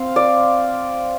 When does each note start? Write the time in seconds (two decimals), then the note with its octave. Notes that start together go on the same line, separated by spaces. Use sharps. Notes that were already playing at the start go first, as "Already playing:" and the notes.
Already playing: C4 F5
0.16 D5